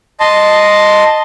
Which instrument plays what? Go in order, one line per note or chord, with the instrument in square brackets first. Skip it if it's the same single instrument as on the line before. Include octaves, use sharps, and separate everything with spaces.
[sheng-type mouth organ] D#5 A5 C6